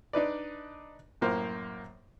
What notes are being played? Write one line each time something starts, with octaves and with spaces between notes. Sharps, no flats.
D4 D#4 B4 D5
F#2 A2 A#3 A#4 C5